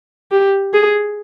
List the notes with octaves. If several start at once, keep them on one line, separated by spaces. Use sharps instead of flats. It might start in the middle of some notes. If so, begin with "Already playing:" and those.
G4
G#4